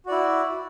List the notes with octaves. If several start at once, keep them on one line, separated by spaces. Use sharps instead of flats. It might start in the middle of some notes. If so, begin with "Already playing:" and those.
E4 F#4 D5